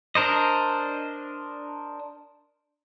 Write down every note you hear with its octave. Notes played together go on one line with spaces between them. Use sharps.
D4 A#4 C5 D#5